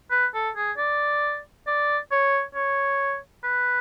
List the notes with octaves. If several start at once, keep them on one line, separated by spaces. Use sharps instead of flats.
B4
A4
G#4
D5
D5
C#5
C#5
B4